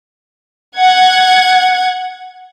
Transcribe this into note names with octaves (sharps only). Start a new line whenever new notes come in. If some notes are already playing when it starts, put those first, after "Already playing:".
F#5 G#6